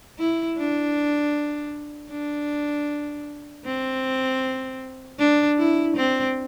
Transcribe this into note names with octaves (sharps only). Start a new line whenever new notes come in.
E4
D4
D4
C4
D4
E4
C4